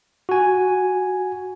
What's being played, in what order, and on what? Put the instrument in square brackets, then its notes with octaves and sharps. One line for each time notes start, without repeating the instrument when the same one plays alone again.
[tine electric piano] F#4 G#5